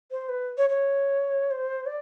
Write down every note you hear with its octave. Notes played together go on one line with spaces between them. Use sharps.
C5
B4
C#5
C#5
C5
D5